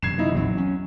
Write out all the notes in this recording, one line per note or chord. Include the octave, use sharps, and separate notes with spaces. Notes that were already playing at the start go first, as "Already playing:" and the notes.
F#2 C3 E3 G#6 C7 E7
F#3 D#4 E4
A#1 E2 F#3 C4
C#4